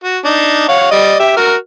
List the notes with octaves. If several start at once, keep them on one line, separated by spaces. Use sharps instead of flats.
F#4
D4 D#4
C#5 F5 F#5
G3 D5 D#5
G4 E5
F#4 A#4 F6